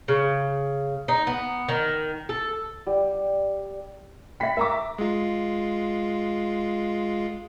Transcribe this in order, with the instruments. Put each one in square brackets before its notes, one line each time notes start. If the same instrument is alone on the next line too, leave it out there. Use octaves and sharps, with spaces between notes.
[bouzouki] C#3
D#4
B3
D#3
A4
[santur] G3
[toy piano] E5 G5 [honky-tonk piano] B5 B6
[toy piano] A#4 [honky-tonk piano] E5 A#5 D6
[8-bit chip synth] G#3 F4